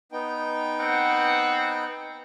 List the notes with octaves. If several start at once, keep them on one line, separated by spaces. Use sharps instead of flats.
B3 D#4 G5
C4 F#5